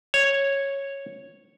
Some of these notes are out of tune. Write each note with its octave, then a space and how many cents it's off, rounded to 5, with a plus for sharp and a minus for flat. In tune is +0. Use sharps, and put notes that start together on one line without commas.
C#5 -5